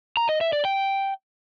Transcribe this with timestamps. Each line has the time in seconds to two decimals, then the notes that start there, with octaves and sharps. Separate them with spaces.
0.17 A#5
0.29 D#5
0.41 E5
0.53 D5
0.65 G5